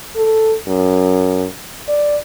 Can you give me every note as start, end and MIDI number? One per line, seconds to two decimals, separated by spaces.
0.16 0.55 69
0.68 1.46 42
1.88 2.17 74